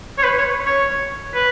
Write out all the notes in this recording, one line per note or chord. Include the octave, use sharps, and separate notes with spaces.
C#5
B4
C#5
C#5
B4